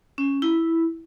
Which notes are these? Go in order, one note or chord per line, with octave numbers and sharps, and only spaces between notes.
C#4
E4